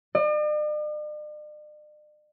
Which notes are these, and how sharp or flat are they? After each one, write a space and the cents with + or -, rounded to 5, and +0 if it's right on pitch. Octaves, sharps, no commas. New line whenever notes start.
D5 +45